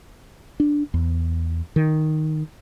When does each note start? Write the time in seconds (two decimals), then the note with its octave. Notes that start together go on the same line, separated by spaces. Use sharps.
0.60 D4
0.94 E2
1.76 D#3